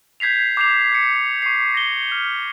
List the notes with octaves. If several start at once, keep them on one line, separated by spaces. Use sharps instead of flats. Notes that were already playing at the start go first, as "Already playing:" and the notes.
G6 G#6 B6 C7 F7
D6 G6 C7 F7
G6 C#7
C#6 C7
A#6 G7
F6